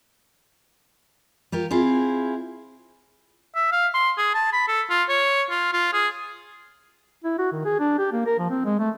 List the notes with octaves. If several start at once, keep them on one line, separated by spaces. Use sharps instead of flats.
F4 G4 A#4
C4 E4 F4 G#4
E5
F5
C6
G#4
A5
B5
A4
F4
C#5
F4
F4
G#4
E4
F#4
D#3
G#4
D4
G4
A#3
A#4
F3
C4
G#3
A3